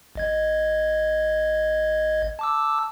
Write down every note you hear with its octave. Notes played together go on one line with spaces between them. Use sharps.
A1 D#5 G#6
A5 D6 E6